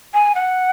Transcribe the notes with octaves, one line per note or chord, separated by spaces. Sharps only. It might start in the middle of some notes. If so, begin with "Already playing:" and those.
G#5
F#5